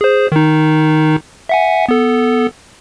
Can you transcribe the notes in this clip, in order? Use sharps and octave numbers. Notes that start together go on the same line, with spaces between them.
G#4 C5
D#3 D#4
E5 F#5 G#5
B3 A4